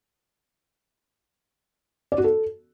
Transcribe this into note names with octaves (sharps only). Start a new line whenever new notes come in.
D5
F#4
A4